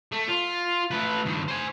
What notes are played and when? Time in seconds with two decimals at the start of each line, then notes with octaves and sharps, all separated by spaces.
0.12 A3
0.28 F4
0.91 A3 B4
1.26 G2 D#3
1.48 C5 G#5